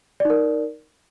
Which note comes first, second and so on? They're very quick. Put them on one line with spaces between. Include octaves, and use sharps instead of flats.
D5 D#4 A#4